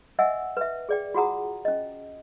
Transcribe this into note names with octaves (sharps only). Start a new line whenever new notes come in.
D#5 E5 F#5 G#5 E6
B4 E5
G#4 D5 G5
F4 F#4 G#4 F#5 A#5 D#6
C#4 D#5